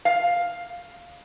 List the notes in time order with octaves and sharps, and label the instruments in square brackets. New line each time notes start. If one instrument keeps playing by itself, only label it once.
[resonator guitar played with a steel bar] F5